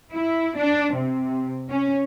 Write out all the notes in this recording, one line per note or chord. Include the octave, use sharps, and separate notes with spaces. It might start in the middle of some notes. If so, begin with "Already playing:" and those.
E4
D4
C3
C#4